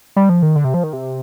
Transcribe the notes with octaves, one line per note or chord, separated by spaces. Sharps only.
G3
F3
D#3
D3
C3
F3
D#3
C3